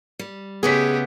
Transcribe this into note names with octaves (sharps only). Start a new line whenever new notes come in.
G3
C#3 G#3 A3 B3 G4 G#4 B6